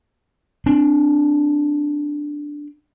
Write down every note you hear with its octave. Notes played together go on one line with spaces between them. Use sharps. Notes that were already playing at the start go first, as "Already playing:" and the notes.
C4 D4